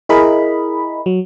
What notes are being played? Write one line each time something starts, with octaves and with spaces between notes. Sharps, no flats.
E4 G#4 A#4 D#5 B5
F#3